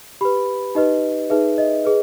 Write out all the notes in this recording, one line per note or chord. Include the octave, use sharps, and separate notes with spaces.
G4 B4 B5
D#4 G4 B4 D#5
D#4 G#4 B4 E5
D#5
G#4 B4